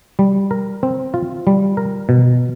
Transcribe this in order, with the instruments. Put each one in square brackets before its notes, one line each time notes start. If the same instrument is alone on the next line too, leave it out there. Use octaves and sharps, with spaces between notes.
[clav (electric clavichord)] G3
A#4
C4
F4
G3
A#4
B2